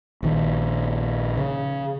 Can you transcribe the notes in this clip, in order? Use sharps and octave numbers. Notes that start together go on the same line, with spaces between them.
A#1 D#3
C#3